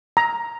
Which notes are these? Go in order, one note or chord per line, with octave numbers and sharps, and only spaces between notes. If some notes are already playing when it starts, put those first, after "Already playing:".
A#5